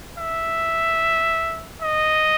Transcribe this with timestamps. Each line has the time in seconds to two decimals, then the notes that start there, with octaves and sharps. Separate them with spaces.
0.18 E5
1.82 D#5